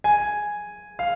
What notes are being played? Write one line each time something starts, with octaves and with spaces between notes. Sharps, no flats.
G#5
F5